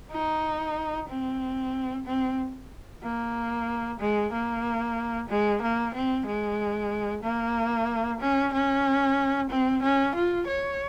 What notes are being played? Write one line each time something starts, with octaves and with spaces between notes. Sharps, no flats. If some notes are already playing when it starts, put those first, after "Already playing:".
D#4
C4
C4
A#3
G#3
A#3
G#3
A#3
C4
G#3
A#3
C#4
C#4
C4
C#4
F4
C#5